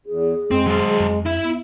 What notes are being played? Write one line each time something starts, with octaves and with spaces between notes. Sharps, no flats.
E2 G#4
F2 G#3 C4
F#3 C5
F2
E4 E5
B3